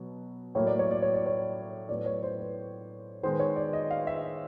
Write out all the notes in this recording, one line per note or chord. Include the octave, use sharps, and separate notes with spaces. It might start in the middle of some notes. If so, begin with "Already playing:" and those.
Already playing: B2 F#3
A2 F#3 A#3 C#5
D5
C#5
D5
C#5
D5
C#5
A2 F#3 B3 D5
C#5
C5
B4
D#3 G#3 B3 C5
C#5
D5
D#5
F5
E5